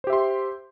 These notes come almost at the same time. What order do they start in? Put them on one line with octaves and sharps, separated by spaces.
C5 G4 E5 C6